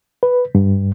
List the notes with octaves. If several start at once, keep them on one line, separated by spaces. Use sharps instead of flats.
B4
G2